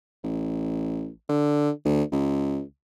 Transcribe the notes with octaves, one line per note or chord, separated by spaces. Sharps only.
A1
D3
D2
C#2